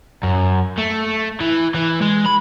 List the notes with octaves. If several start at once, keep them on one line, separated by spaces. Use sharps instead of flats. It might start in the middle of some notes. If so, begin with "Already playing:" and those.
F#2
A3
E3
E3
G#3
B5